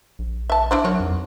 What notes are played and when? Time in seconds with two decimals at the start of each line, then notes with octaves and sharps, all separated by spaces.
0.19 A#1
0.50 E5 A5
0.71 D4 E4 C5
0.84 D#3 F#3 F#4 C#5
1.00 F2